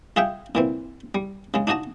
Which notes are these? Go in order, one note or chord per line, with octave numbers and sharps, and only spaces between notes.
F4 G#4 E5 F#5 G5
A#2 E3 C4
G3
C#3 G#3
D4 D#4 F#4 D#5 A5